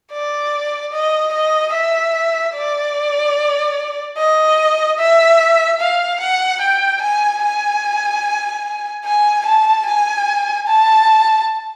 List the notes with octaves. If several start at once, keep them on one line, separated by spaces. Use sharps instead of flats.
D5
D#5
D#5
E5
D5
D#5
E5
F5
F#5
G5
G#5
G#5
G#5
A5
G#5
A5